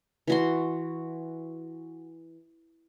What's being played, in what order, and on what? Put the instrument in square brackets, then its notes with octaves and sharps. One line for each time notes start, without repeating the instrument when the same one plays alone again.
[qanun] E3 F#4 C6